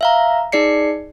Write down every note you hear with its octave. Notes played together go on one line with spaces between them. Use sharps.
E5 F5 A#5
D#4 G#4 D5 C7 C#7